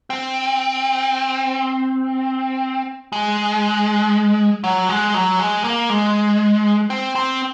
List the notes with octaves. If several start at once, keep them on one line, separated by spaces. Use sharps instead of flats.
C4
G#3
F#3
G#3
F#3
G#3
A#3
G#3
C4
C4